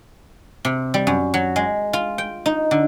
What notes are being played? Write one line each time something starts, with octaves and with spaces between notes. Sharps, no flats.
C3
G3
F#2
F#3
G#3
F4
G5
D#4
D3